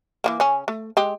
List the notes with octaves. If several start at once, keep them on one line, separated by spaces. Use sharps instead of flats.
E3 F3 A#3
C#3 C#4 G#5
A3
G#3 G4